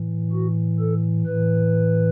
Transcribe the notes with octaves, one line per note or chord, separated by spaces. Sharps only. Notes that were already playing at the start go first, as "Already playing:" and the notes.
Already playing: A2 E3
F#4
A4
A2 E3 B4